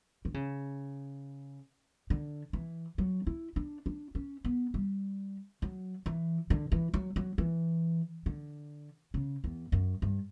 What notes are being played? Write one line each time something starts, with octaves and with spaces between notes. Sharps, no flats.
D3
C#3
D3
E3
F#3
E4
D4
D4
C#4
B3
G3
F#3
E3
D3
E3
F#3
F#3
E3
D3
C#3
E2
F#2
G2